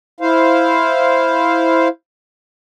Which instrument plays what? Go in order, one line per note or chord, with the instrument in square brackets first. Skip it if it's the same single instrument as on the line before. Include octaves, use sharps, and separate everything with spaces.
[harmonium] E4 C5 F5